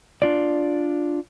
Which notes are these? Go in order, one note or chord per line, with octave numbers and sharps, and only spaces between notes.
D4 F4 D5